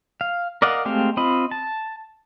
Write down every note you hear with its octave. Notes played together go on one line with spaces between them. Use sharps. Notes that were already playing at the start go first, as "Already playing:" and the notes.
F5
A#4 D5 D#5 F5 F#5
G#3 A3 C4 G4 F5
C4 F4 D#5 B5
A5